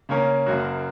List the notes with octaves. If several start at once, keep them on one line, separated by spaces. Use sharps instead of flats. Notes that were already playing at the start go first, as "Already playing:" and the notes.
C#3 A#3 C#4 A#4
F#1 F#2 C#3 A#3 F#4